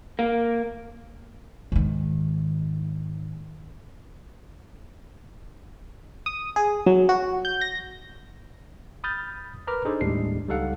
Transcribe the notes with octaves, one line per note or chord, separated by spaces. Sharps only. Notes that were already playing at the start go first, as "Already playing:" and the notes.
A#3
G#2 D#3
D#6
G#4
F#3
F#4
G6
A#6
B5 D#6 F6 G6 A6
A#4 B4 A#5 B5 D6 F6
D4 D#4 G#4 A4 C5 D5
D#2 A2 G3 G#3 D4 C7
C#2 G3 D#4 A4 F5 F#5